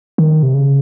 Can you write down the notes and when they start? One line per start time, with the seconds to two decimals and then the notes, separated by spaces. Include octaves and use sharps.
0.18 D#3
0.43 C3
0.54 C#3